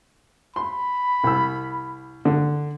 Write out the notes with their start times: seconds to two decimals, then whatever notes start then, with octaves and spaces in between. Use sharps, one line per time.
0.56 B5 C6
1.24 C2 E6
2.25 D3